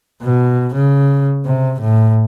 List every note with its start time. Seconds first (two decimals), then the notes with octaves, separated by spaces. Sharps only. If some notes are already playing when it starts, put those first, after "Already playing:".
0.22 B2
0.74 C#3
1.45 C3
1.81 A2